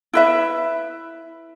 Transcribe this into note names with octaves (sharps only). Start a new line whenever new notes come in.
E4 B4 E5